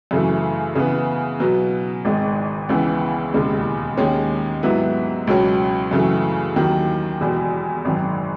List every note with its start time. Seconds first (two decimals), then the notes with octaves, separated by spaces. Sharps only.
0.11 F#2 C#3 E3 A3
0.75 C#3 E3 B3
1.40 B2 F#3 B3
2.05 G#1 G#2 D#3 G#3
2.69 C#2 C#3 E3 B3
3.34 E1 D#2 C#3 G#3
3.97 D#2 D#3 G#3 C#4
4.63 G#2 F#3 B3 E4
5.27 C#2 B2 F#3 C#4
5.91 F#2 C#3 E3 A3
6.56 D#2 D#3 F#3
7.21 E1 E2 B2
7.85 G#1 F#2 D#3 F#3